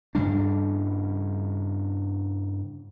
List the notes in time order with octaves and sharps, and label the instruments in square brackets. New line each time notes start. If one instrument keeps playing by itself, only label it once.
[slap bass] G2 C#3 G3 D4